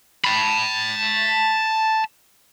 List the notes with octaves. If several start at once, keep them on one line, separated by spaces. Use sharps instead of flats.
A5 B5